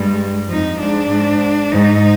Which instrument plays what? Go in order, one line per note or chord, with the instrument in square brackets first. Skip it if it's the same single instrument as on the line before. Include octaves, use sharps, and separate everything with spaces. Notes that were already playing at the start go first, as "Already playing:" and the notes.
Already playing: [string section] G2 G3 [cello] G#3
[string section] F2 F3 [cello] D#4
[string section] G#2 [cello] D4
[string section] G#2
[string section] G#2 [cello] D#4